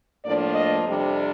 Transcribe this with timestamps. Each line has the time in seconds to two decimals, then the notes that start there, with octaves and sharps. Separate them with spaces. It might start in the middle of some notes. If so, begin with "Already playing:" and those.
0.25 A2 F3 A#3 D4 D5
0.54 D#5
0.84 F2 C3 G3 D4